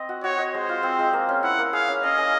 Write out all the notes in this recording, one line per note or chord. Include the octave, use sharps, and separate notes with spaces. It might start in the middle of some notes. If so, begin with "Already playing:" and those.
Already playing: C4 D#5
F#4
F#4 C#5
D#5
G#3 C5
F4
C4
G#3
A#3
C#4
E4 F#5
A#3
G#4 F5
C#4
C#4 D#5
G#4